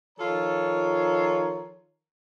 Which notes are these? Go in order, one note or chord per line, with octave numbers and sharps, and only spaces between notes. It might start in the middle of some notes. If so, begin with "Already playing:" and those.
D#3 F3 F4 A4 C#5 A#5